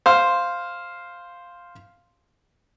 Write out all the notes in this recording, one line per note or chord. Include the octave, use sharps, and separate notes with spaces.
C5 F5